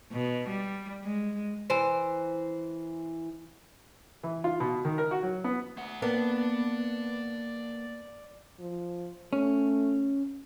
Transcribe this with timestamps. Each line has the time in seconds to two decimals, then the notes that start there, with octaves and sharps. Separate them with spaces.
0.12 B2
0.48 G3
1.04 G#3
1.70 E3 C5
4.23 E3
4.44 F4
4.60 B2
4.85 D#3
4.98 A#4
5.11 F#4
5.23 F#3
5.44 B3
5.77 A3 F#5
6.02 A#3 B3 D5 A5
8.60 F3
9.33 A3 C#4